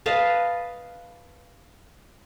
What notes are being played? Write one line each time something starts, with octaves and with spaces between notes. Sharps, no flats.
B4 D#5 F5 A5